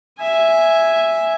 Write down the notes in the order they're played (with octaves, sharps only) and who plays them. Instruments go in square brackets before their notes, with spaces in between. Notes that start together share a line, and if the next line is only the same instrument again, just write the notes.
[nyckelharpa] E5 G#5